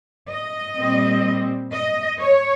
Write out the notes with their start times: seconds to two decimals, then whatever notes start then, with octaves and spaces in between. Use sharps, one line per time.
0.29 D#5
0.76 A#2 G3 C4
1.72 D#5
2.19 C#5